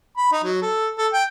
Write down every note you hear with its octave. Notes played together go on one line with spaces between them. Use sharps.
B5
D#4
F#3
A4
A4
G5